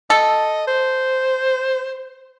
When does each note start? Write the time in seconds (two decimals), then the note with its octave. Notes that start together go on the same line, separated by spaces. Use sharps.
0.10 A4 D#5
0.67 C5